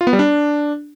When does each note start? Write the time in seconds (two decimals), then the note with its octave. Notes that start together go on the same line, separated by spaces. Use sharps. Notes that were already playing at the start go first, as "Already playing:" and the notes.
0.01 F4
0.07 B3
0.13 G3
0.19 D4